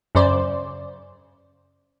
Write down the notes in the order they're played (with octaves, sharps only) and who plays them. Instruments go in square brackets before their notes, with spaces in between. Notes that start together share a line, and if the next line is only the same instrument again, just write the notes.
[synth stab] F#2 C#3 C5 D5